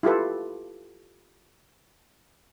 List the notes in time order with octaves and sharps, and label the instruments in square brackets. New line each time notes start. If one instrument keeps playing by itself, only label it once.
[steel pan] E4 F4 G4 A4 B4